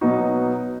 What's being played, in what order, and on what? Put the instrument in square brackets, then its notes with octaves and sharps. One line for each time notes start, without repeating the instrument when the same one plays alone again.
[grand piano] B2 F#3 B3 D#4 F#4